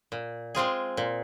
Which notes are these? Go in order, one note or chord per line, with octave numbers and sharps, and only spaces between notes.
A#2
G#3 C4 F4 G#4
A#2